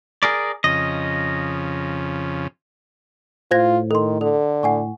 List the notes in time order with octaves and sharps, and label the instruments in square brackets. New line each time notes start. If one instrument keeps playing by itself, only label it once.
[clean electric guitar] G#4 A#4 D5
[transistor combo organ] F2 C#3 [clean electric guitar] D#5
[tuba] A2 [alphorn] F4 [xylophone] C5 G#6 A#6
[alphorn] D#3 [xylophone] A4 C6
[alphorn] D3 [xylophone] A4
[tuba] A2 [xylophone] F#5 G#5 C#6